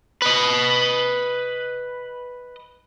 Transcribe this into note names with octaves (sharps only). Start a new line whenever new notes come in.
B4 D#5